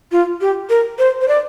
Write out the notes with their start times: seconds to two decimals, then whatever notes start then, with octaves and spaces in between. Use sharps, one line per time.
0.12 F4
0.41 G4
0.70 A#4
0.99 C5
1.21 C5
1.28 D5